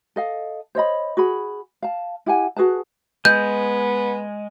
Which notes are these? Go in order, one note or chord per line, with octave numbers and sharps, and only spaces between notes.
A4 D#5 F5
C5 C#5 D#5 B5
F#4 G#4 B5
F5 A5
E4 G4 F#5 G#5
F#4 G#4 B4 A5
G#3 B3 G6